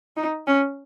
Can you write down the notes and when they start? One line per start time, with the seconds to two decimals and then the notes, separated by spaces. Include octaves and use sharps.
0.17 D#4
0.47 C#4